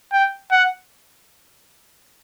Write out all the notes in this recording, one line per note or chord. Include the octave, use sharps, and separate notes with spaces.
G5
F#5